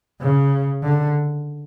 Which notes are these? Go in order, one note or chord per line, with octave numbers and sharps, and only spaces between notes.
C#3
D3